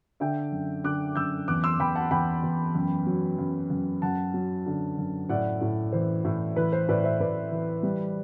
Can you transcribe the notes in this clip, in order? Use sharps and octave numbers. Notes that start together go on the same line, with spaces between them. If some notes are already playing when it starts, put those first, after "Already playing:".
D3 E5 G5
F#2
D3 D6 F#6
F#2 E6 G6
E2 D6 F#6
C6 E6
E2 G5 B5
F#5 A5
E2 G5 B5
E2
F#2
F#3
F#2
F#2
F#2 F#5 A5
F#3
D3
F#2
A2 D5 F#5
A2
E3 C5
A2
E3 B4
C5
A2 B4 D5
C5 E5
A2 B4 D5
E3
G3